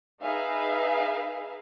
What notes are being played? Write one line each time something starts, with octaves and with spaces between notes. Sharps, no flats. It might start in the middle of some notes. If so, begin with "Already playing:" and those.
D#4 G#4 B4 E5 F5